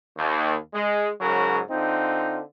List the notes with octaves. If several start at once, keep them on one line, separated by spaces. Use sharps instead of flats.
D#2
G#3
G#2 C#3 F#3 A#4
D3 C4 D#4 F4